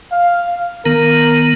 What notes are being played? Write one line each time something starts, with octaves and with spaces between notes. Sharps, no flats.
F5
D#3 B3 A#4